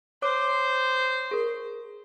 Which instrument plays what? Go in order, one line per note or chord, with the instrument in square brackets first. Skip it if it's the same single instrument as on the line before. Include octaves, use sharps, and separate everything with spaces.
[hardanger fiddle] C5 [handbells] C#5 D6
[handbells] G#4 A#4